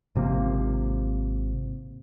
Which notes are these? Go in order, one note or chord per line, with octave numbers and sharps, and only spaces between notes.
G#1 C3 F3 A#3